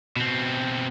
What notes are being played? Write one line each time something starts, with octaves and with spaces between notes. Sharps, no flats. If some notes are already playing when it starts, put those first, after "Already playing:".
B2 C4